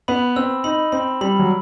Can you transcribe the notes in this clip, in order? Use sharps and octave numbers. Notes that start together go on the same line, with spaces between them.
B3 B5
C4 E6
D#4 B5
C4 B5
G3 B5
F#3